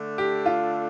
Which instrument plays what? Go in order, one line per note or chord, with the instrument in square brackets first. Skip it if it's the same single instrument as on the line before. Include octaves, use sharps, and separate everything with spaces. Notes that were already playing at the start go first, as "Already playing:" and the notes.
Already playing: [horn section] D3 A3 D4
[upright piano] G4
F4